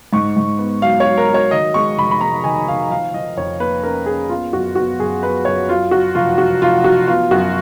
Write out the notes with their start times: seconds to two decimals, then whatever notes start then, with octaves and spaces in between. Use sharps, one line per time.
0.13 G#2 C#6
0.37 G#2
0.59 B3
0.82 F#3 F5
1.00 F#3 C#5
1.18 A#4
1.28 F#3
1.34 C#5
1.51 D#3 D#5
1.74 G#3 C#6
1.97 F1 B5
2.11 B5
2.21 G#3 A#5
2.44 D#3 G#5
2.68 D#3 F5
2.90 F3 F5
3.14 F3 D#5
3.37 F2 C#5
3.60 A#3 B4
3.83 C#4 A#4
4.06 C#4 G#4
4.29 B3 F4
4.53 F#2 F#4
4.75 B3 F#4
4.99 F#2 G#4
5.23 B3 B4
5.45 F#2 C#5
5.69 F#3 F4
5.91 F#3 F#4
6.15 F1 F4
6.38 F#3 F#4
6.62 F1 F4
6.84 F#3 F#4
7.07 B3 F4
7.31 F#2 F#4